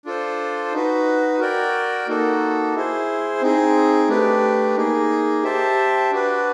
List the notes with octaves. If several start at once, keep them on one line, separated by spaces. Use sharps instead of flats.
D4 F4 A4 C5
D#4 F#4 B4
F#4 A#4 D5 G5
A#3 D#4 F#4 A4
E4 G#4 C5
C4 D#4 G#4
A3 D4 G4 B4
A#3 D#4 G#4
G4 C5 E5 A5
D4 F#4 B4